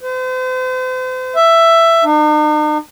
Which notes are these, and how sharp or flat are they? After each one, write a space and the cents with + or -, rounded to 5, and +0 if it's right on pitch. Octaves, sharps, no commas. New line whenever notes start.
C5 -40
E5 +10
D#4 -45